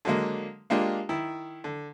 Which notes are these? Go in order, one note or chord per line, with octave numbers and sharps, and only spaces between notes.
D3 F#3 G#3 A#3
G#3 A#3 D4 F4 G4
D#3 E4
D3